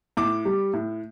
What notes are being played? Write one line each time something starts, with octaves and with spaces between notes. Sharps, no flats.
A2 D6
G3
A2